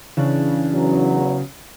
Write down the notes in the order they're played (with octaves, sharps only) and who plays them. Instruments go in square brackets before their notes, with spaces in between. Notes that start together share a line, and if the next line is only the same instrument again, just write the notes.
[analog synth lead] C#3 [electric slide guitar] E3 D4
[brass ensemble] E2 F#3